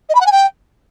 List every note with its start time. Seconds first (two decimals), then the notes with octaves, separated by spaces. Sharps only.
0.09 D#5
0.15 B5
0.20 F#5
0.26 G#5
0.32 G5